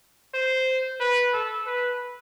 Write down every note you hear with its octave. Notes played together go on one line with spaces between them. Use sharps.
C5
B4
A4
B4